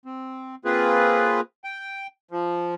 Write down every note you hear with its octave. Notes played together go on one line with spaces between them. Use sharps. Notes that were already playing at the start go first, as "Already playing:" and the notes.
C4
A#3 C4 F4 G#4 B4
G5
F3